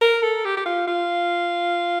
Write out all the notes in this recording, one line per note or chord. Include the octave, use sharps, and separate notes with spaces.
A#4
A4
G4
G4
F4
F4